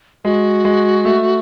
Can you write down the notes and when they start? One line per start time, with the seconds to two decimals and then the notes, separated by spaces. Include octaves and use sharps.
0.25 G#3 F#4
0.65 G#3
1.05 A3